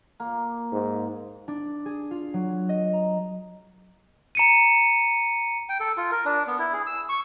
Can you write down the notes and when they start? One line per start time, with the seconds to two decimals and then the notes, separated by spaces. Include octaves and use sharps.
0.20 A#3
0.72 G#2
1.48 D4
1.86 G#4
2.11 F4
2.34 F#3
2.69 D#5
2.93 A#5
4.35 A#5 C#7 D#7
5.69 G5
5.80 A4
5.97 F4
6.12 A#4
6.25 D4
6.47 B3
6.59 E4
6.73 G#4
6.86 E6
7.09 C#6